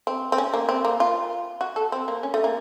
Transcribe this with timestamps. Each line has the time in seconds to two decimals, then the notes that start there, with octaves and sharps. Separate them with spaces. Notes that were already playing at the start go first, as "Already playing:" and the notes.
0.07 C4
0.32 C4
0.38 C#4
0.54 A#3
0.69 C4
0.85 A#3
1.00 F4
1.61 F#4
1.76 A4
1.92 C4
2.08 A#3
2.23 C#4
2.34 A3
2.44 A#3